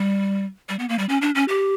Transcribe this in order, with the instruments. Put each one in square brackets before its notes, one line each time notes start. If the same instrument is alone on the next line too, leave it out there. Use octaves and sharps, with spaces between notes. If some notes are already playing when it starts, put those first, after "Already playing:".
Already playing: [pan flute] G3
G3
B3
A#3
G3
C#4
D4
C#4
G4